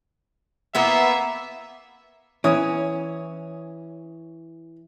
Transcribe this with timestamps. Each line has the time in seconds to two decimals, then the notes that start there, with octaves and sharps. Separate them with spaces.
0.75 A#3 B3 E4 E5
2.44 E3 C#4 C#5 D#6